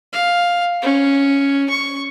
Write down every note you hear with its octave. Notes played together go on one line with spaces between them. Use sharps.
F5
C#4
C#6